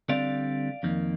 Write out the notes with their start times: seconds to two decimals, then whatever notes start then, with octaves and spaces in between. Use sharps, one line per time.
0.09 D3 G3 C4 D5 F5
0.83 F2 D#3 A#3